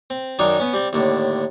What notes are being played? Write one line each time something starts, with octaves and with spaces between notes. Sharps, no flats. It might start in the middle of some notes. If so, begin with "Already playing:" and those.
C4
F#2 D#3 D4 D#4 C#5 D5
B3 C#4
G3 C4 G4
D#2 A2 D3